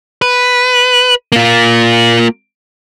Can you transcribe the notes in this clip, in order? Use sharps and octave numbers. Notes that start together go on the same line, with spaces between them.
B4
A#3 F4